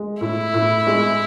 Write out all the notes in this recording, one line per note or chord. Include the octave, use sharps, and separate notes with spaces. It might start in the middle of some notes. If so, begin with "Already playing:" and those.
Already playing: G#3
A2 E4
A2
G#3